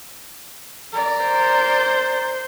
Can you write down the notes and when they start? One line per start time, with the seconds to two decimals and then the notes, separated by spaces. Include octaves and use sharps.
0.92 A#4 D5
1.24 C5